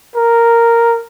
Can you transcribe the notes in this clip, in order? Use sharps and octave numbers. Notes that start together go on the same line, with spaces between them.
A#4